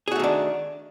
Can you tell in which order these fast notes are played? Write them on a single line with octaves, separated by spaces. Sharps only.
G#4 F#4 A3 D#3 D4